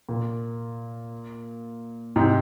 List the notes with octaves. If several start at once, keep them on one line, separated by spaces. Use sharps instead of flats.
A#2
G#2 C3